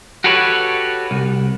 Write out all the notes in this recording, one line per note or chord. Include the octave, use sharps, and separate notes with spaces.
F#4 G4 A4 B4 C#5
C2